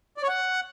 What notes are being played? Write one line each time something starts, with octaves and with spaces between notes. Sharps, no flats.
D5
C#5
F#5